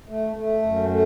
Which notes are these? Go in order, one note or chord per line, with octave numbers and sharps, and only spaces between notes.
A3
A3
F#2
A3